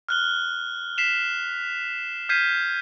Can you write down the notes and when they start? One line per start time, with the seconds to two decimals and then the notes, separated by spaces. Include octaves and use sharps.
0.09 F6 F#6 G7
0.98 B6 C7 E7 F7
2.29 F6 G6 G#6 B6 C7 D#7